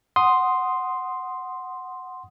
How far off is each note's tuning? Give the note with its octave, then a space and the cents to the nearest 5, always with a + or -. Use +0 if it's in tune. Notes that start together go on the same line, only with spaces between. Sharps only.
F#5 +0 C6 +0 D#6 +0